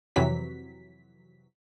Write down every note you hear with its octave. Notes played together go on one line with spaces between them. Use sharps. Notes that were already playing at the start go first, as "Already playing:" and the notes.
F2 C3 E3 F#3 B6